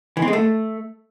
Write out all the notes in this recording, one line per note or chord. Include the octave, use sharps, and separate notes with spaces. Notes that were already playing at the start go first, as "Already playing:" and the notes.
E3
C4
G#3
A3